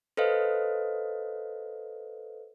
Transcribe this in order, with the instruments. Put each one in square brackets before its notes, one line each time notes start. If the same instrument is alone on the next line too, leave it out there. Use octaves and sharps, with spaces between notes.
[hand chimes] A4 B4 C5 D#5 F5